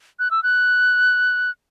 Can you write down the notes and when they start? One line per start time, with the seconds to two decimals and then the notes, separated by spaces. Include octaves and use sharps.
0.19 F#6
0.31 E6
0.43 F#6